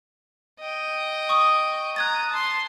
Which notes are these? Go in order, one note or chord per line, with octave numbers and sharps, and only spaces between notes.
D#5 G5
C#6 D#6
A#5 D#6 F#6 G#6 A6
A5 C6